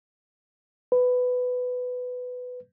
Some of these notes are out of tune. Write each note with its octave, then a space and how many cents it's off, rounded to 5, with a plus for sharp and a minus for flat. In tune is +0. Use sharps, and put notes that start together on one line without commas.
B4 +15